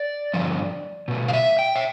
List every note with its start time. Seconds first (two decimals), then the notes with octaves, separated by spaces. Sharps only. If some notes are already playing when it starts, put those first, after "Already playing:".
Already playing: D5
0.33 G2 D3 F3
1.08 B2 A3
1.28 F5
1.33 E5
1.59 G5
1.76 E5